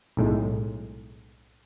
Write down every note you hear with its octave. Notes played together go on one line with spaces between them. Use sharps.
B1 A2 G#3